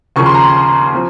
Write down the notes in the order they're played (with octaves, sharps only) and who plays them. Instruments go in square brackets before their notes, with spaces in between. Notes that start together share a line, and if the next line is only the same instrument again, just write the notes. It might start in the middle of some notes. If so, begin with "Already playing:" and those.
[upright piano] D#2 C#3 F3 A#3 C#6
C6
A#5
C6
F3 C4